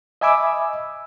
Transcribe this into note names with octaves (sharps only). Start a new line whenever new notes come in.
D#5 E5 G#5 B5 D6 E6